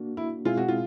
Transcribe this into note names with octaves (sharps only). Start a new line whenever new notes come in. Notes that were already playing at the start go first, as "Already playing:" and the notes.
Already playing: A#3 D4 F#4
E4
B2 G#3 C4 E4 F4 G#4
F#4
F4